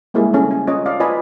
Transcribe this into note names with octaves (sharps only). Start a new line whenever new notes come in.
G3 G#3 A#3 E4 G4 G#4
C#4 G#4 A4
G#5
C#4 F4 C#5 D#5
D5 F5
F4 B4 D5 D#5 G#5 B5